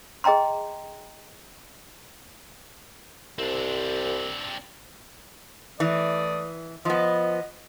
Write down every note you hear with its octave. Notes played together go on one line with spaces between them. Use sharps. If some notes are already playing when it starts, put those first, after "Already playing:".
G#4 D#5 G5 A#5 C6
C2 C4 D4
E3 A3 D5 D#6
F3 B3 D#5